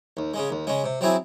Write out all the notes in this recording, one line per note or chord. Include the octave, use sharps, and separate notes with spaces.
D#2
C#3 G#3
D#2
C#3 G#3
C3
F#3 C4 E4 G#4